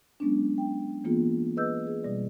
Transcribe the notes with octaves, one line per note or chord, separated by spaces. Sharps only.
F#3 G#3 B3 C#4 D4
G5
E3 A#3 B3 F4 G#4
G#4 B4 D#5 E6 G6
G#4
B2 G3 D5